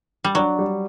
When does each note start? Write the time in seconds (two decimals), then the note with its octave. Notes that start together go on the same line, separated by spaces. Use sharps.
0.24 G3
0.35 F#3 D4
0.59 G3